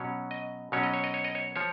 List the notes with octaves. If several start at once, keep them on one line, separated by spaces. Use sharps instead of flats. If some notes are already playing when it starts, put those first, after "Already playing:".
Already playing: B2 F#3 C#4 C#5
D#5
B2 F#3 C#4 C#5
D#5
C#5
D#5
C#5
D#5
C#5
F3 C#5